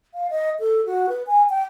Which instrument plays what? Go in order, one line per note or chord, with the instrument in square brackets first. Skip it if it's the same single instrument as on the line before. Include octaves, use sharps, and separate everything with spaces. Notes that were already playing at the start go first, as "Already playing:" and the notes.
[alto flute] F5
D#5
A4
F#4
B4
G#5
G5